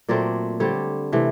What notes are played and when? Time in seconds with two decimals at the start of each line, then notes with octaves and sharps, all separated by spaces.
0.08 A#2 F#3 A3 C4 D5
0.60 D3 G3 C4 C#5
1.13 C3 E3 A3